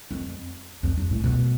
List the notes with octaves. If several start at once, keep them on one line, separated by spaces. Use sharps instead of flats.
F2
F2
G2
A2
B2